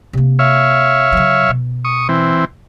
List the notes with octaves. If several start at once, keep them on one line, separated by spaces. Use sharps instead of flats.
C3 A#3
C#5 E5 F5
C#3 F#3
B2
C#6 D#6
E3 C4